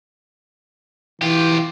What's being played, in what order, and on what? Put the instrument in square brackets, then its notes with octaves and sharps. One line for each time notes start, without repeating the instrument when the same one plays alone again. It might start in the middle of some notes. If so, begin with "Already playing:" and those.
[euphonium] E3 [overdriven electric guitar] F4 G4